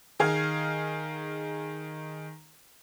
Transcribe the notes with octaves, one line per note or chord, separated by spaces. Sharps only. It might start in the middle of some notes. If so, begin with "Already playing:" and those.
D#3 G#4 F5 F6 G#6